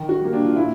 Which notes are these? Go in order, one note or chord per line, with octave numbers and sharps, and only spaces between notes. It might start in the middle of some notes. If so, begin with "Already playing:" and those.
Already playing: D#3
F#4
G3 A#3
D4
F4
A#2 E4